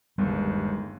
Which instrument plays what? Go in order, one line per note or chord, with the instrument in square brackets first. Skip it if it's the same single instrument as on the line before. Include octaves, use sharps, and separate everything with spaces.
[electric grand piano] G1 D#2 [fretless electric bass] G3 G#3